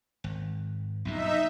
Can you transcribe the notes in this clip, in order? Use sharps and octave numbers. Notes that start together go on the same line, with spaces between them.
G#1
B1 G2 A#2 D#4 E5